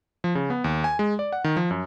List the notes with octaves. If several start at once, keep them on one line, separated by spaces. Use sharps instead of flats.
F3
C#3
B3
D#2
G#5
G#3
D5
F#5
D#3
F3
F#2